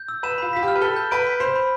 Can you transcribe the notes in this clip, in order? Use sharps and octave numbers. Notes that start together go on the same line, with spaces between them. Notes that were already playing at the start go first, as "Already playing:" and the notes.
Already playing: G6
E6
B4 E7
F4 B5
F4 B6
G4
F6
B4
A4 G7
G6
B4 D7
B6
C5 B5
B5